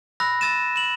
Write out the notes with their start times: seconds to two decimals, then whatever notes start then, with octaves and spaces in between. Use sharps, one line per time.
0.20 B5 E6 F#6 A#6
0.41 E6 A6 D#7 E7
0.76 E7 F#7